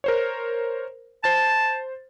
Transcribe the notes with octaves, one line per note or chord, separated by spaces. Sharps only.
A#4 C5 C#5
C5 A5 A6